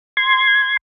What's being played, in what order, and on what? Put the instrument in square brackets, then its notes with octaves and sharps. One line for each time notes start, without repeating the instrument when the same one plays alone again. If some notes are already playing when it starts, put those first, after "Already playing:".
[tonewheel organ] C6 G#6